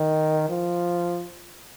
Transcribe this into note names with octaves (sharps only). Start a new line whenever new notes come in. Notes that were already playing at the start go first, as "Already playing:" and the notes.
Already playing: D#3
F3